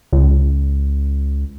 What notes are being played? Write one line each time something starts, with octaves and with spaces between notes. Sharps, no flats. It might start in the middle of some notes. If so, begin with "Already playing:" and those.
C#2